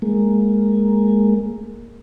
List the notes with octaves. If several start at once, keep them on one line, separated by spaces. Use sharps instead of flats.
G#3 A#3